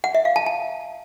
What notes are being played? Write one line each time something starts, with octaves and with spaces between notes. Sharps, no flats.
F#5
E5
F5
A5
A5